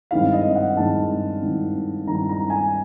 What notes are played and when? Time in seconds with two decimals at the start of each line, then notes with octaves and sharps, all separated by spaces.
0.11 G2 D#3 G#3 C4 E4 F5
0.33 D#5
0.55 F#5
0.76 G2 D#3 G#3 C4 E4 A5
1.42 G2 D#3 G#3 C4 E4
2.07 G2 D#3 G#3 C4 E4 A#5
2.29 A#5
2.50 G#5